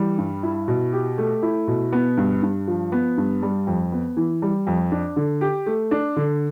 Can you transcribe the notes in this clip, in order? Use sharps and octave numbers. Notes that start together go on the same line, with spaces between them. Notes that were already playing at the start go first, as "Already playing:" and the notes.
Already playing: E3 G3
G2
E4
B2
G4
A3
E4
B2
B3
G2
G2
F3
B3
G2
G3
F2
B3
E3
G3
F2
D4
D3
G4
A3
D4
D3